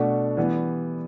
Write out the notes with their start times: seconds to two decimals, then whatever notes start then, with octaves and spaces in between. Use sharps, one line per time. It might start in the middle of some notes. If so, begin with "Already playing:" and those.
Already playing: B2 A3 D4 F#4
0.37 E3 G3 B3